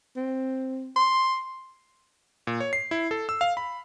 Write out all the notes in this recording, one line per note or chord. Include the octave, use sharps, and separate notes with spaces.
C4
C6
A#2
C#5
C7
E4
A4
E6
F5
B5